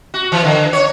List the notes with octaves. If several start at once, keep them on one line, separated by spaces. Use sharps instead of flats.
F#4
E3
D3
C#5